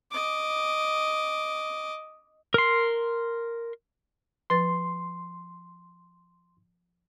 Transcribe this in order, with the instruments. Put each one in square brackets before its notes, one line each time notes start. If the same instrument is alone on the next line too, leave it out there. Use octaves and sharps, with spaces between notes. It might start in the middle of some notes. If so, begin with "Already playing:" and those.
[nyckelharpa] D#5 D6
[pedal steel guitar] A#4 C6
[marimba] F3 B4 A6 [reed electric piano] C6